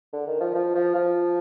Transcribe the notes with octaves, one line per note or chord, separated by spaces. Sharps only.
D3
D#3
F3
F3
F3
F3